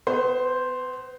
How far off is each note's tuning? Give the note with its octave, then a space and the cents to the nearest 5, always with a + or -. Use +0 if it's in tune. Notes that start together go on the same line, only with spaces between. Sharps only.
B3 +35 C5 +0